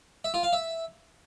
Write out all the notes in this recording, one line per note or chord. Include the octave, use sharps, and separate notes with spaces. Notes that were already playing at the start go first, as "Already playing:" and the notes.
E5
F4
F5
E5